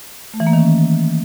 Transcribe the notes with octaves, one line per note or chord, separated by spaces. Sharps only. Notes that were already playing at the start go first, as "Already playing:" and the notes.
A3
E3
A#3
D#3
C#4